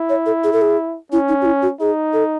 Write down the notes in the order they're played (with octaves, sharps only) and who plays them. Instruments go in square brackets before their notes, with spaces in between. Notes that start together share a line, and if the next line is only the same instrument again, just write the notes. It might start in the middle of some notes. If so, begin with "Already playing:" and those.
Already playing: [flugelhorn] E4
[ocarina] C#5
A4
G#4
A4
G#4
[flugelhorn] C#4 [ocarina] E4
[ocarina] D#4
F#4
E4
F#4
[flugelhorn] D#4 [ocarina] G#4
[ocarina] A4